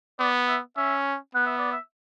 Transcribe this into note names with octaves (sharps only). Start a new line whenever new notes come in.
B3 D5
E5
C#4 E5
B3 F#5
E5
D5
E5